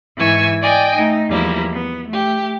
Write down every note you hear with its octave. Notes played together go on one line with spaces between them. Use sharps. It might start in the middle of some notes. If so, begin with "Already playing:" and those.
G#2 E3 G#5 C#6 E6
D5 D#5 G5 G#5
A3 D#4
E2 F3 G3 A#3 E4
B3
A3 G4